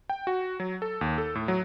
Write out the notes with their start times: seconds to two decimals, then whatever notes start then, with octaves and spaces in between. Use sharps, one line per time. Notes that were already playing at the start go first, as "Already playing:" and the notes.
0.10 G5
0.27 F#4
0.60 F#3
0.82 A4
1.01 D#2
1.18 A4
1.35 A2
1.48 F#3